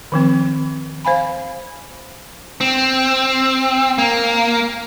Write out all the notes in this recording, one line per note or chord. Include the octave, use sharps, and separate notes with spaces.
D#3 F3 C4
C5 F5 G#5 B5
C4
A#3